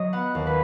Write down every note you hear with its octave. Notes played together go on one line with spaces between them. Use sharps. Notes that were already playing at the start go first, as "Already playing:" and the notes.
Already playing: F#3 D#5
B3 F#5
D#2
B4